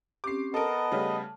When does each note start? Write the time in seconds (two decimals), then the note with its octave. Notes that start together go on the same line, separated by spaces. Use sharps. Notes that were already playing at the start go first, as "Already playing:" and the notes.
0.24 C4 C#4 G4 D6 C7
0.54 B3 A4 A#4 D#5 A5
0.92 C#3 G3 A3